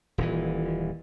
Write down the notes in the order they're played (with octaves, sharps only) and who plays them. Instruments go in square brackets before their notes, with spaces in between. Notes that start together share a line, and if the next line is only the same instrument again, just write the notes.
[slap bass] D#1 A#2 E3